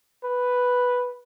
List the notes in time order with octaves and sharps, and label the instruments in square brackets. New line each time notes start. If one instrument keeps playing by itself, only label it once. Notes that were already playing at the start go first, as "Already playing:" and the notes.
[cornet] B4